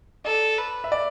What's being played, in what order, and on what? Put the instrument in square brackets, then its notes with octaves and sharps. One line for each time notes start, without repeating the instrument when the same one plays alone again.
[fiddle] A4 [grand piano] D5
[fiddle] B4
[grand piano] E5
D5